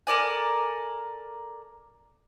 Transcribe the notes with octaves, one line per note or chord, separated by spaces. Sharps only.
A4 A#4 D5 G#5